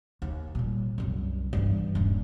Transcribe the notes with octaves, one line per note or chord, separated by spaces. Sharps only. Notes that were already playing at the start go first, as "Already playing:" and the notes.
D#2
A#2 G3
C2 F#2
G2 E3
D#1 G2